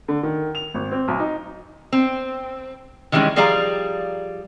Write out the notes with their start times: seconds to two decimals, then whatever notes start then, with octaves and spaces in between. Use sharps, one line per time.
0.08 D3
0.23 D#3
0.55 F7
0.74 G#1
0.91 C4
1.08 B1
1.20 D#4
1.92 C4
3.12 D#3 E3 G3 G#3 C#4
3.36 F3 G3 G#4 D5 F5 A#5